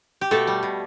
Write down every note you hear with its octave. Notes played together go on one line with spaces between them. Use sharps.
G4
B2 A3 A4
G3
B2